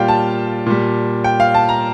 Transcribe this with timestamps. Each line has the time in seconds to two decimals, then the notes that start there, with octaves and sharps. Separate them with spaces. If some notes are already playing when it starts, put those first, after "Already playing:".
Already playing: A#2 G3 F5 G5
0.08 A5
0.66 A#2 G3
1.24 G5
1.40 F5
1.54 A5
1.69 A#5